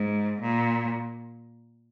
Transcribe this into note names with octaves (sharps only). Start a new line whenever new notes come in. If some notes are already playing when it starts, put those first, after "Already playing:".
Already playing: G#2
A#2